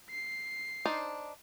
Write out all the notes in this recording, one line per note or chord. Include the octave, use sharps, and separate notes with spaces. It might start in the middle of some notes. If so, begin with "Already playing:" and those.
C7
D4 D#4 C5